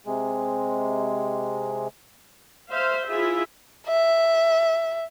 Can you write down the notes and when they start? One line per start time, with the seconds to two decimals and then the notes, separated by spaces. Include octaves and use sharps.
0.06 C3 G#3
2.68 C5 E5 F5
3.07 E4 F4 G#4 E5
3.88 E5